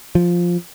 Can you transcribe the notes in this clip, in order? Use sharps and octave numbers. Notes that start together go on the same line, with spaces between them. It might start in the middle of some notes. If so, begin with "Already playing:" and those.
F3